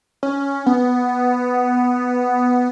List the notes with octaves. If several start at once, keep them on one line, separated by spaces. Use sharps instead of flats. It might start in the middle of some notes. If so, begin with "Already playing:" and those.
C#4
B3